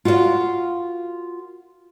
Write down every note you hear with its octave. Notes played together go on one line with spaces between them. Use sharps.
F4 F#4 A#4 D5 F5